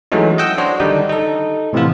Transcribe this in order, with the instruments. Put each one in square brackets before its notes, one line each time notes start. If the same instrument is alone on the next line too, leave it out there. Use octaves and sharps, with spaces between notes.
[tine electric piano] E3 F#3 G#3 A3 C#4 D#4
D#5 F#5 G5 E6
D4 F#4 C5 C#5
D3 D#3 G3 D4 D#4
D#4 A4
A2 C3 E3 F3 B3 F4